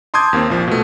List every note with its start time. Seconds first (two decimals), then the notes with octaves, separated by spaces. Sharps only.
0.14 A5 C6 D6 D#6 G6 G#6
0.33 D#2 A#3 C4
0.50 A#1 F3
0.68 B2 A3